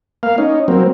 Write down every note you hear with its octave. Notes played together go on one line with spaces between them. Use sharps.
A#3 F5
C#4 D#4
F#3 A#3 C4